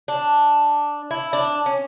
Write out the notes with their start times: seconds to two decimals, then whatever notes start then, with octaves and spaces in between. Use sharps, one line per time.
0.08 D4
1.11 E4
1.33 D4
1.66 C#4